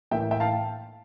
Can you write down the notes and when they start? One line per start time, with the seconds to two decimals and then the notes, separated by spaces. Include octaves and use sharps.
0.11 A2 E3 A#3 E5 G5
0.31 E5 G5
0.40 F5 A5